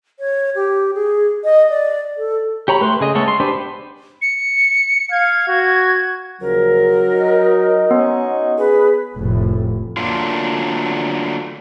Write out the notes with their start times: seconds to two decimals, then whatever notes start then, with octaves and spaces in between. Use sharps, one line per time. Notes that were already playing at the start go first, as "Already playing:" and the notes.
0.20 C#5
0.56 G4
0.94 G#4
1.44 D#5
1.70 D5
2.17 A4
2.68 G4 C#5 A#5 B5
2.81 A3 B4 C6
3.00 C#3 G#4 D#5
3.15 G#3 A3 B3 A4 C#5
3.28 C6
3.40 D4 G4 B4 C5
4.22 C#7
5.12 F5 G#6
5.48 F#4
6.41 D#2 C#3 F3 F#3 A#4
7.11 D#4 F#4 D#5
7.91 B3 C#4
8.58 G#4 B4
9.16 F1 A2
9.97 D3 F#3 A3 A#3 D4 F4